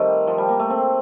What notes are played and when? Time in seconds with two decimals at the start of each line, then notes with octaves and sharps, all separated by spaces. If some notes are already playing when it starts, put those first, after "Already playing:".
Already playing: D#3 G3 A3 C4
0.27 F3
0.38 G3
0.49 A#3
0.60 A3
0.70 C4